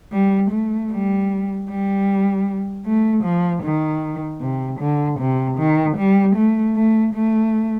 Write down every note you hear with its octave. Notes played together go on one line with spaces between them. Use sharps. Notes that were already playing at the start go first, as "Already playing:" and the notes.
G3
A3
G3
G3
A3
F3
D#3
C3
D3
C3
D#3
G3
A3
A3
A3